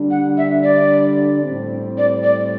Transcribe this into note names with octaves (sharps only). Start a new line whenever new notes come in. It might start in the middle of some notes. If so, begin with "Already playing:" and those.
Already playing: D3 G3 D4
F#5
E5
D5
A2 G3 C4
D5
D5